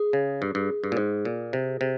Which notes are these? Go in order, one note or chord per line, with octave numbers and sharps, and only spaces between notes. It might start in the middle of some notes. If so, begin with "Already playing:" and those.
Already playing: G#4
C#3
G2
G2
G2
A#2
G#2
A#2
C3
C3